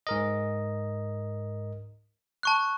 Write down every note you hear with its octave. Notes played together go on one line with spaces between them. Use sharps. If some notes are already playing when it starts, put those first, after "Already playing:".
G#2 A#4 D#5
A5 C#6 F#6